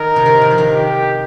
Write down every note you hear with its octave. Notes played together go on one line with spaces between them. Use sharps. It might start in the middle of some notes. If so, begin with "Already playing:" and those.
Already playing: D#3 A#4
C3
D#3
C3
F3
D#3
G4